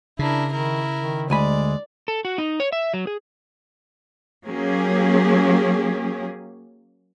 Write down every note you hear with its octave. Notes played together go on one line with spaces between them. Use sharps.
C#3 D4 E4 A#4
D#3 E4 A#4
D#3
D2 G#3 D5 G#5 B5
A4
F#4
D#4
C#5
E5
F#3
G#4
F#3 A#3 C#4 G4 G#4